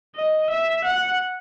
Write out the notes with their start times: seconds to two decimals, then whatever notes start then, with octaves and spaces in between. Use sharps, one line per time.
0.16 D#5
0.50 E5
0.85 F#5